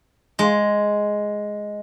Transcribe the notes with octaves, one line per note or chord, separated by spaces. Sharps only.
G#3